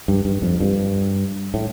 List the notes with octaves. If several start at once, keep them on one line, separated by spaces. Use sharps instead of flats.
G2
G2
F2
G2
A2